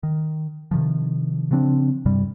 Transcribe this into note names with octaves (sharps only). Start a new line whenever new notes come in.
D#3
C3 D#3 F3
C#3 F3 C4 D4
G2 C3 G3